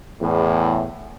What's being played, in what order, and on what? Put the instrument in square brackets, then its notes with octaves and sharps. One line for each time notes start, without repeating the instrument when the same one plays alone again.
[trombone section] E2 A2